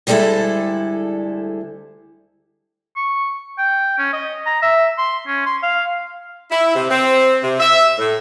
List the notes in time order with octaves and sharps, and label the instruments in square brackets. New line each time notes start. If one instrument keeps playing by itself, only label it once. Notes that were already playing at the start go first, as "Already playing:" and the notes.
[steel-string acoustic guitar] D2 G3 G#3 E4 A4 E5
[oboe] C#6
G5
C#4
D#5
A#5
E5
C6
C#4
C6
F5
[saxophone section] E4
C3
C4
C3
E5
A2